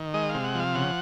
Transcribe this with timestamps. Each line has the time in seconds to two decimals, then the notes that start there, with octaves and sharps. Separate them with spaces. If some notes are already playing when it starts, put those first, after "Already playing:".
Already playing: D#3
0.14 G#3 D#5
0.29 F5
0.34 C3
0.44 F#5
0.55 F3
0.60 F5
0.75 C#3 F#5